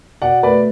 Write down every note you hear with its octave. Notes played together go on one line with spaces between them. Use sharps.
B2 D5 F#5
A3 B4 D5